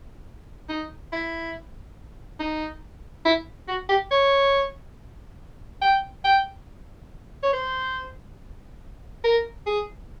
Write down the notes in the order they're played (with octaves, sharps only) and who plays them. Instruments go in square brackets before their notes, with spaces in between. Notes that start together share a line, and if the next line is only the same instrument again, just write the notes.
[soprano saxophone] D#4
E4
D#4
E4
F#4
G4
C#5
G5
G5
C#5
C5
A#4
G#4